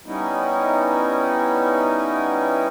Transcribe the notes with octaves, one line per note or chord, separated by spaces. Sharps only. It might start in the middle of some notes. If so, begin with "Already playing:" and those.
G3 B3 C#4 D#4 E4